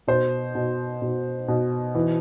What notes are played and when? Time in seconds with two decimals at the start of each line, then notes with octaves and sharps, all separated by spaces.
0.07 B2 C5
0.55 B2
1.02 B2
1.48 B2
1.95 E3